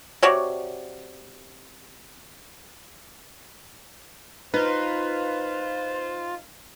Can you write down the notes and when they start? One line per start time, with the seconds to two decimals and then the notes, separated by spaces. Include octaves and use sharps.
0.23 C3 F#4 C#5 D5
4.54 D#4 F4 B4 C5